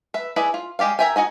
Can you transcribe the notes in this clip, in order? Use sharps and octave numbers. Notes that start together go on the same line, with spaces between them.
B4 E5
E4 G#4 B4 D5 D#5
F4
G#3 G4 D5 F5
A#4 C#5 E5 G5 G#5
D#4 F#4 D#5 G#5